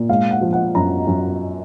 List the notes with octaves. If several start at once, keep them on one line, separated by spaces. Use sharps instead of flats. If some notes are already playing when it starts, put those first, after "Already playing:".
Already playing: A#2
G#3 F5
F#5
F3
F#5
F#2 A#5
F#2